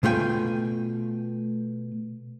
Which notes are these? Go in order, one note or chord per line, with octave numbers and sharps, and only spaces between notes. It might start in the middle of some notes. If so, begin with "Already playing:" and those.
B2 A3 F4 F#4 G5 G#5